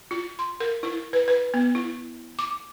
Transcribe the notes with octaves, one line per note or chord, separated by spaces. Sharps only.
F4
C6
A#4
E4
B4
B4
B3
E4
D6